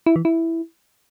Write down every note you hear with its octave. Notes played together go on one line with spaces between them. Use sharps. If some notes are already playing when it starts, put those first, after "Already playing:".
E4
E3
E4